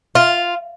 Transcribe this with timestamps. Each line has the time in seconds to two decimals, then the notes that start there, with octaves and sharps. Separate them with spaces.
0.15 F4